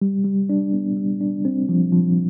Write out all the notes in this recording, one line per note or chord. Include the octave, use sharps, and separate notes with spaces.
G3
G3
D4
B3
G3
D4
C4
F3
F3